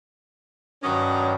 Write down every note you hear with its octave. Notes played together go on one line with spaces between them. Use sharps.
G2 D#3 F#3 C#4 D#6